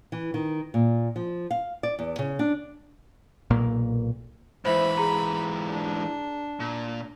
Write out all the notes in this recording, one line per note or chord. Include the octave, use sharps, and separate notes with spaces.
E3
D#3
A#2
F3
F5
D5
E2
C#3
D4
B1 A#2 A#3
G#2 E3 C5 E5 B5
G#4 A#5
D4
A#2